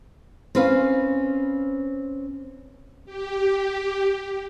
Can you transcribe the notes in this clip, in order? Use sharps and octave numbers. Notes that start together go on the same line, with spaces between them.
C4 C#4 B4 F5 G#5
G4